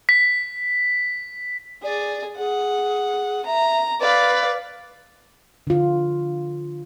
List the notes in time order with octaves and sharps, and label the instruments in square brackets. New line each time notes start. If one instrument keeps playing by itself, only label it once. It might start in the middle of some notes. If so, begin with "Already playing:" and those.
[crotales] B6
[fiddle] G#4 [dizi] D5
[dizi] G#4 [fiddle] F#5
[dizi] E5 [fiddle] A#5
[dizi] B4 [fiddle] D5 F5
[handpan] D3 F4